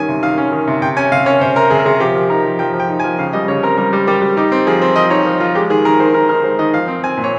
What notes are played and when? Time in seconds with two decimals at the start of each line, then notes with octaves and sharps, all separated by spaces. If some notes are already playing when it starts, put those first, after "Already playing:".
Already playing: D#3 G3 C#4 G#5
0.09 C3
0.23 D#3 F5
0.38 C#4
0.52 D#3
0.68 C3
0.82 C3 G5
0.97 C#4 G#5
1.12 C3 F5
1.26 C#4 C#5
1.41 C3 C5
1.56 C3 A#4
1.70 C3 G#4
1.80 A#4
1.86 C3 G#4
2.00 F3 G4
2.15 F3
2.30 D#4 A#4
2.45 F3
2.59 F3 G5
2.74 F3
2.80 G5
2.89 D#4
2.99 G#5
3.04 F3
3.19 C#3 F5
3.33 G3 D#5
3.48 C#3 C#5
3.63 C4 A#4
3.78 G3 A#4
3.93 G3
4.07 G3 G4
4.22 G3
4.37 D#4 G4
4.52 C4
4.67 F3 G#4
4.81 C4
4.96 F3 D#5
5.10 D#4 C#5
5.26 F3
5.40 F3 F4
5.55 G#3 G4
5.70 D#3 G#4
5.85 D#3 A#4
6.00 D#3 C5
6.14 D#3 A#4
6.29 D#4 A#4
6.43 G#3 C5
6.59 D#3 D#5
6.74 F3 F5
6.88 C4
7.03 C4 G#5
7.17 A#2
7.24 C#5